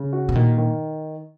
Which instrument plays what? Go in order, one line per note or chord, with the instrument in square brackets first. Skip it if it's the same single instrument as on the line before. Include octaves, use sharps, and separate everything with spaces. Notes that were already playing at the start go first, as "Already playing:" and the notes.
Already playing: [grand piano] C#3
F#4
[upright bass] B2
[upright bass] A#2 [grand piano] D#3
[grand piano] D#3